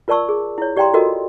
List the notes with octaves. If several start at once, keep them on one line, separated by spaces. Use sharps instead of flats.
F4 A#4 D5 A5 C#6 E6
G#4
E4 C#5
G4 D5 F5 G5 A#5 C6
F4 F#4 A4 A#4 D#5